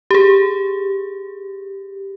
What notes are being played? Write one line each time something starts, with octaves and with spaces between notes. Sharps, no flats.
G4 G#4